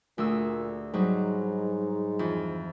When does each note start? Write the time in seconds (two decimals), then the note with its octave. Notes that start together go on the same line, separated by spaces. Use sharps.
0.18 D2 A#2 G#4 E6
0.94 G#2 F#3 G3 D#4
2.19 F2 E3